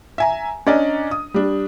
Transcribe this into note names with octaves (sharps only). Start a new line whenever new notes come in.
E5 G#5 A#5
C#4 D4 D5 D#5 A#5
D#6
G3 D4